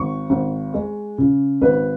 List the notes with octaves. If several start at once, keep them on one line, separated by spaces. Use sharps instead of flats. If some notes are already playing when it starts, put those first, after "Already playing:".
Already playing: G#1 C#6
G#1
G#3
C#3
G#1 B4